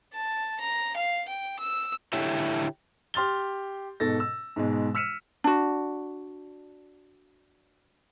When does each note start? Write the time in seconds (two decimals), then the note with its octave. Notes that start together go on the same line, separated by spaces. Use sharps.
0.14 A5
0.60 A#5
0.96 F5
1.29 G5
1.59 E6
2.13 D3 E4 G4 C#5 E5
3.14 G4 C6 F6 A6 G7
4.00 G#2 B2 A4 A6 A#6
4.20 E6
4.56 G#2 B2 G#3
4.95 E6 F6 B6 C#7 D#7 E7
5.44 D4 F#4